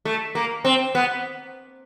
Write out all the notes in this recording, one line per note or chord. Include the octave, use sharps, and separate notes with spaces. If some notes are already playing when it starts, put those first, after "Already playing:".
A3
A#3
C4
B3